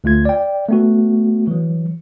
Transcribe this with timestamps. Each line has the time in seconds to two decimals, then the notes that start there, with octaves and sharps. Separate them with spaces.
0.04 D2 A3 F4 G#6
0.25 D5 G5
0.69 A3 B3 F#4
1.47 E3 F#3